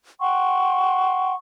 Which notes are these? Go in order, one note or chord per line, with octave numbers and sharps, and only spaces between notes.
F#5 G5 C6 C#6